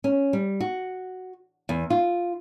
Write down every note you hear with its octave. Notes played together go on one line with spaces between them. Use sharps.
C#4
G3
F#4
E2
F4